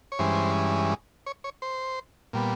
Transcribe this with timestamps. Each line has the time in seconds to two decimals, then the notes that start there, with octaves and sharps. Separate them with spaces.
0.12 C#5
0.19 G2 E3 G#3 C#4 C5
1.26 C#5
1.44 C#5
1.62 C5
2.33 A#2 G3 B3